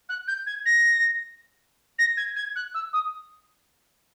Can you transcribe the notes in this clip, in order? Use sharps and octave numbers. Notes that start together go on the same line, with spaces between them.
F#6
G6
G#6
A#6
A#6
G#6
G#6
F#6
E6
D#6